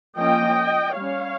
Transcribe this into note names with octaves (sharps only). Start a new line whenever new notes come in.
F3 A#3 C#4 D#5 G5
G3 C#4 C#5 F5